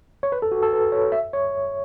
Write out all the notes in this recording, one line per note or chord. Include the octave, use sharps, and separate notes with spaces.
C#5
B4
A4
F#4
A4
B4
C#5
E5
C#5